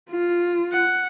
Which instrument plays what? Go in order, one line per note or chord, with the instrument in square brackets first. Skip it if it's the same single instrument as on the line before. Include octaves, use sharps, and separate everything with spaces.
[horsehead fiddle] F4
[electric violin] F#5